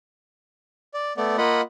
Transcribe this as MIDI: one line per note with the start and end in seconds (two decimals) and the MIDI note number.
0.94 1.13 74
1.17 1.36 57
1.17 1.36 59
1.17 1.36 74
1.38 1.61 58
1.38 1.61 65
1.38 1.61 75
1.38 1.61 78
1.38 1.61 83